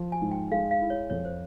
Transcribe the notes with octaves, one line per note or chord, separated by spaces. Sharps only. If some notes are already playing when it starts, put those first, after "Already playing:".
Already playing: F3
G#5
G#2
G5
G#3 F5
F5
E4
C#5
F2 C#5
C5